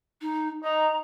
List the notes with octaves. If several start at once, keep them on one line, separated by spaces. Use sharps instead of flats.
D#4
D#4 A#5